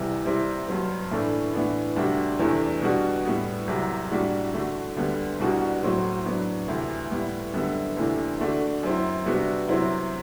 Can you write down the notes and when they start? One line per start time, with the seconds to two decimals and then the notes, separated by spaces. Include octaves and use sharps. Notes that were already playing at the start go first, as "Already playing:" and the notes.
Already playing: C2 C3 E3 G3
0.25 C3 G3 C4 E4
0.68 G2 F#3 C4
1.11 A2 E3 A3 D4
1.53 A2 E3 B3 D4
1.96 D2 C3 G3 D4 F#4
2.39 E2 C3 E3 A3 D4
2.82 B2 G3 D4 F#4
3.25 A2 G3 B3
3.67 C2 C3 F#3
4.11 A2 G3 D4 F#4
4.53 D3 A3 D4 F#4
4.97 D2 D3 G3 B3
5.39 C2 B2 G3 D4 F#4
5.83 A2 F#3 C4 F#4
6.25 A2 F#3 B3 D4
6.68 D2 C3 E3
7.11 A2 G3 B3 E4
7.53 F#2 D3 G3 B3
7.97 D2 C3 E3 A3 D4
8.40 D3 A3 D4 F#4
8.83 F#2 F#3 C4 E4
9.26 C3 G3 B3 D4 F#4
9.68 C3 F#3 C4 E4